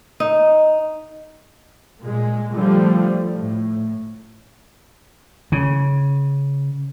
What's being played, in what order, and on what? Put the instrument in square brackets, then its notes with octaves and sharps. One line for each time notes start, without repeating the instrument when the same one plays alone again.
[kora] D#4
[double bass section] A#2 G#3
D3 F3 G3 A3
A2
[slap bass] C#3